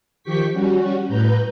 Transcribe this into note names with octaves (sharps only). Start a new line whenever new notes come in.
D#3 F3 G4 G5 C#6 B6
G3 C#4 F#4
A2 B4 A#5 G6